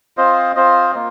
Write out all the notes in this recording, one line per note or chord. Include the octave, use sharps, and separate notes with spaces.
C4 F4 C5 D#5
C4 F4 C5 D#5
A#3 F4